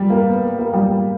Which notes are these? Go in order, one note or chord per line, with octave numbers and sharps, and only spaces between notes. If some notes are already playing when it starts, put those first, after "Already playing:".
Already playing: G3
A#3
B3
A#3
G3